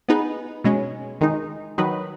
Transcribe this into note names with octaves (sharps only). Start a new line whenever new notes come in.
B3 D#4 G#4 B4
B2 G#3 C#4
D#3 G#3 D#4
D#3 F#3 D#4 B4